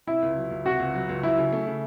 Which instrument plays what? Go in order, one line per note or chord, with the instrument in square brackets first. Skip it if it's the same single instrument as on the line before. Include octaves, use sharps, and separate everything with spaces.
[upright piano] C3 [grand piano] E4
[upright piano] C#2
F#3
C#2
[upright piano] C3 [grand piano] F#4
[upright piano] C#2
F#3
C#2
[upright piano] F#3 [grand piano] E4
[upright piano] C#3
A3
C#3